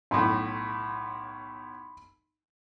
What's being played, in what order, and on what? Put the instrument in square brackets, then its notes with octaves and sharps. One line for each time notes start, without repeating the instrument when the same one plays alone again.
[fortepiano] B1 A2 [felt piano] B5 C6